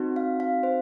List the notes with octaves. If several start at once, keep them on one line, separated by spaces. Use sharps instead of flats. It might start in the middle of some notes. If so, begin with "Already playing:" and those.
Already playing: C4 D#4 F#4
F5
F5
C5